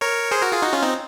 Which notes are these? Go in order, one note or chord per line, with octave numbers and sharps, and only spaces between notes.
A#4 C#5
G#4 C5
F#4 A#4
F4 G#4
D#4 F#4
C#4 F4
C4 D#4